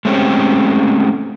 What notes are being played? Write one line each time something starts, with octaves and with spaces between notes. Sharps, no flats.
G#3 A3 C4 C#4 G4